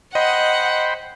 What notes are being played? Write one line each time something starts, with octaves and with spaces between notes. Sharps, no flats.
C5 D#5 F#5 G5 B5